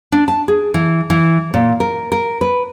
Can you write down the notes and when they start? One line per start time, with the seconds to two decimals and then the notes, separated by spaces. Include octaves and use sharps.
0.12 D4
0.28 A5
0.48 G#4
0.74 E3
1.10 E3
1.54 A#2
1.80 A#4
2.12 A#4
2.41 B4